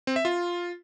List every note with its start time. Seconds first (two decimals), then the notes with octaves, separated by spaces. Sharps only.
0.07 C4
0.16 E5
0.25 F4